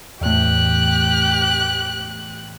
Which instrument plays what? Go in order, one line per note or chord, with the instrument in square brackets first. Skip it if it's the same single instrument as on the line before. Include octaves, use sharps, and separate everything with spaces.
[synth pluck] E2 A2 [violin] G4 F#6